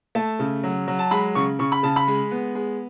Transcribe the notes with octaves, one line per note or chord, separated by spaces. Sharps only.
A3 A5
C#3
F#3
F#3
A5
G#3 B5
C#3 C#6
C#3 C#6
B5
C#3 A5
B5
G#3
B3
G#3